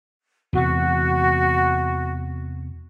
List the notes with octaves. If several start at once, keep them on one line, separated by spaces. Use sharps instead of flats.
E2 C3 E3 F#4